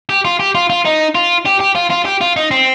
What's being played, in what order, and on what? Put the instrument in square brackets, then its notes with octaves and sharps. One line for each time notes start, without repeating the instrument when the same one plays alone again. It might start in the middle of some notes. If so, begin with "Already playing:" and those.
[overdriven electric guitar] G4
F4
G4
F4
F4
D#4
F4
G4
G4
F4
F4
G4
F4
D#4
C4